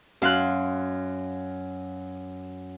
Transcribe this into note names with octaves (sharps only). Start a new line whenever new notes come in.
F#2 F5 C6 F#6